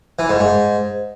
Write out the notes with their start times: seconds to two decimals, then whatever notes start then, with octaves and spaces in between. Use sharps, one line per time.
0.19 E3
0.30 G#2
0.40 G#2